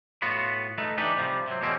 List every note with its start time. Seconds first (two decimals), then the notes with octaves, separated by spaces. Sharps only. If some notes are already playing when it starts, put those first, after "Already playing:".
0.22 A2 B3 F4 F#4 B5
0.78 A3 D#4 A4 B4
0.98 E3 D4 D#4 G4 B4
1.17 C3 F3 G3
1.48 C3 F#3 C4
1.61 E2 B2 D#3 A#3 C4 C#4